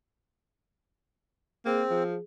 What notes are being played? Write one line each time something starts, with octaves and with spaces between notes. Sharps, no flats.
A#3 C4 G#4
F3